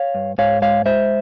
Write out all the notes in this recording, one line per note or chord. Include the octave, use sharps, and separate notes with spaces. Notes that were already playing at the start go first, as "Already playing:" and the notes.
Already playing: C#5 F5
G2
G#2 C#5 F5
G#3 C#5 F5
G#3 C5 E5